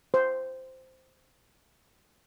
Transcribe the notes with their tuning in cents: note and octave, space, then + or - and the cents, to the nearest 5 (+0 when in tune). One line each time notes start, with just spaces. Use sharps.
C5 -5